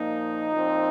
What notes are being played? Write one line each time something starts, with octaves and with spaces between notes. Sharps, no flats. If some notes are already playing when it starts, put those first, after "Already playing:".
Already playing: A#2 F3 A#3 D#4
A#2 F3 C4